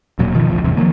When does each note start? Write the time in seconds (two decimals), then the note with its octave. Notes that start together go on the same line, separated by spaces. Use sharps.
0.19 E1 A#2 F#3
0.34 G1 B2 D#3 F3
0.48 A1 D2 F3
0.64 A1 E2 G2 C3
0.77 D#3 F3 F#3 A#3